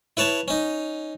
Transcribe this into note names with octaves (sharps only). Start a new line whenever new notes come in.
E4 B4 C#5 A5
C#4 D#4